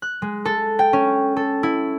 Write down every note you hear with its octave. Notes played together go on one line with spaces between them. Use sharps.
F#6
G#3
A4
G5
C#4
A4
E4